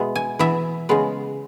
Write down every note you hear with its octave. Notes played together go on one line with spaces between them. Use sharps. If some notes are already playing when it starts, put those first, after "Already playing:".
Already playing: B2 G#3 B3 E5
G#5
E3 B3 E5
C#3 G#3 B3